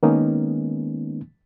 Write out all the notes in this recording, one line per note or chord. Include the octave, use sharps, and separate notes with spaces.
D#3 G#3 A#3 B3 C#4 D#4